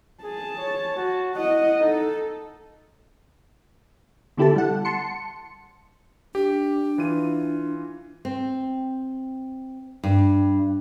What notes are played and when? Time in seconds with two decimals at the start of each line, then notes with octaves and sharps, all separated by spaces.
0.23 G#4 A5
0.58 C#5
0.97 F#4
1.35 E4 D#5 F#5
1.80 D#4 A4
4.37 B2 D3 E4 G4 A4 A5
4.56 G3 F#5
4.85 A5 C6 C#7
6.35 D4 G4
6.98 E3 F4 D#7
8.25 C4
10.03 G2